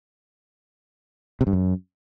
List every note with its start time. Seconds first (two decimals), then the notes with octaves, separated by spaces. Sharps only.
1.41 C3
1.47 G2
1.53 F#2